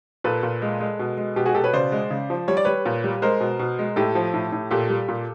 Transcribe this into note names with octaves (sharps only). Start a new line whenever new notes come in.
A#2 A4 B4
A#2
G#3
G#3
B2
G#3
B2 G4
F#4 G#4
B2 G4 A4
B4 C#5
C#3 C5 D5
G#3
C#3
F3
G3 C#5
D5
G3 B4 C#5
A#2
G3
G#3 A#4 C5
B2
B2
G#3
A2 G4 A4
F3
A2
A2
A#2 G4 A4
G3
A#2